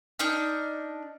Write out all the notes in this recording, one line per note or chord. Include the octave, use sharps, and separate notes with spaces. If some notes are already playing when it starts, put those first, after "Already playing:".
D4 D#4 F6